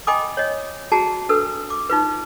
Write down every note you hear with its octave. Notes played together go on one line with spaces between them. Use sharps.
D#5 G5 G#5 B5 D6 D#6
C#5 D#5
F#4 G#4 A5 A#5
D4 A4 B4 E6
D6
D#4 F4 B4